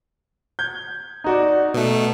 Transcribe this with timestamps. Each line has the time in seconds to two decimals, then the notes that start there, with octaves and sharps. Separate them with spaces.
0.59 G6 G#6
1.24 D#4 F#4 D5
1.74 B2 A3